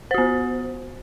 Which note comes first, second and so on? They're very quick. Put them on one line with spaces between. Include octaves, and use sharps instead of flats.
C5 F#4 B3